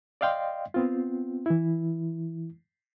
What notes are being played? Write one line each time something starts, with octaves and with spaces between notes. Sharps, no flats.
D5 D#5 F5 G5 C6
B3 C4 F4
E3 E4